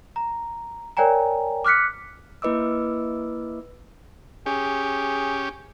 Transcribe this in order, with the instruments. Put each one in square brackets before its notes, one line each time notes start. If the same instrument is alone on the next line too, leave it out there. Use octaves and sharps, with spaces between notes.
[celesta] A#5
A#4 C#5 D5 G5 G#5 A#5
D6 F6 F#6 B6 C#7
[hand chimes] A#3 E4 B4 D#5 D6 E6
[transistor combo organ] C#4 G4 [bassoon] G#4